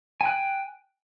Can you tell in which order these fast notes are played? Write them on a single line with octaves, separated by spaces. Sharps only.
G#5 G5 F#6